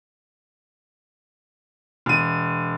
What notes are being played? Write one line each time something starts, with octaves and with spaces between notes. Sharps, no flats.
E1 D#7